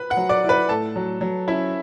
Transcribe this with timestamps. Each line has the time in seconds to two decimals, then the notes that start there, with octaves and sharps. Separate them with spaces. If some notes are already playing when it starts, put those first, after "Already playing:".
Already playing: B4 B5
0.10 F#5 F#6
0.17 F#3
0.29 D5 D6
0.44 E4
0.49 B4 B5
0.69 A2 A4 A5
0.96 F#3
1.21 F#3
1.47 C#4 E4 E5